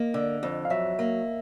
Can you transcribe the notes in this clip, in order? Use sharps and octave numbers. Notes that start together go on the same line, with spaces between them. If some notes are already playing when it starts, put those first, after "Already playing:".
Already playing: A#3 D#5
D3
F2
F5
F#3 E5
A#3